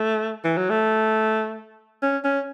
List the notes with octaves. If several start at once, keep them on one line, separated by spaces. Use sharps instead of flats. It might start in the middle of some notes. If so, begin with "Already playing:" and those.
Already playing: A3
E3
F#3
A3
C#4
C#4